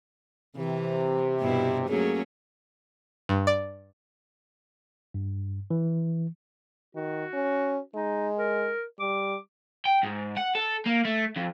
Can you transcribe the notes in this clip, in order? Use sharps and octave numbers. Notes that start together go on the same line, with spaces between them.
C3 E3
G2 B2 E4
F#3 A3 A#3 C#4 G#4
G2
D5
G2
E3
D#3 F#4
C#4
G#3 D#4
A#4
G3 D6
G5
G#2
F#5
A4
A#3
A3
F2